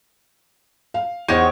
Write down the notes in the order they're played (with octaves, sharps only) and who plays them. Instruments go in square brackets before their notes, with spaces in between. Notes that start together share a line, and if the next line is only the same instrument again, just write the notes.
[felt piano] F5
[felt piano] E2 C5 F#5 [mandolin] D#4 G4 C#5